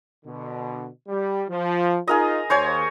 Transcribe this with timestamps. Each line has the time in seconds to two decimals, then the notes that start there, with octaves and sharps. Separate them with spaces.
0.25 B2 D3
1.07 G3
1.49 F3
2.08 D#4 F4 G#4 A#4 D#5
2.50 D#2 C5 C#5 G#5